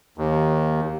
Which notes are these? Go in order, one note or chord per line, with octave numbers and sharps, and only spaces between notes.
D#2